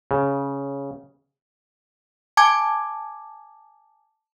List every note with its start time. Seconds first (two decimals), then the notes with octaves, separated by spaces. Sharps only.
0.11 C#3
2.37 G#5 A5 D6 G#6